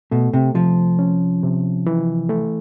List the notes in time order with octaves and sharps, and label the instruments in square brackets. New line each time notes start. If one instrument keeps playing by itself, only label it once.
[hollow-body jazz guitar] B2 [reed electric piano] A3
[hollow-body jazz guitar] C3
[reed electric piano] C3 [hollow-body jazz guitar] F3
[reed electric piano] C#4
C3
E3
A3